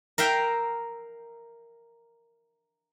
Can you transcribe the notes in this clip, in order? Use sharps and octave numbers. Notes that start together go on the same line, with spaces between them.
A#4 E5 F5 G5